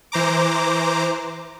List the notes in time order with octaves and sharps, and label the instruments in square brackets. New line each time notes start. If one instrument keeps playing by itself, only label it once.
[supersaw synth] E3 C5 A#5 D6